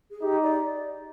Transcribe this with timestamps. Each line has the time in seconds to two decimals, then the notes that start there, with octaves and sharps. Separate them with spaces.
0.11 G#4
0.22 D#4 G4
0.43 D5